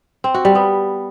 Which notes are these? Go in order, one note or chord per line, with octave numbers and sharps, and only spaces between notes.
C4
F#4
G3
B3